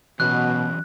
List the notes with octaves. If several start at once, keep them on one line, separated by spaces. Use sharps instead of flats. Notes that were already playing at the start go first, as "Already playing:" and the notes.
B2 E3 F#3 C#4 F#6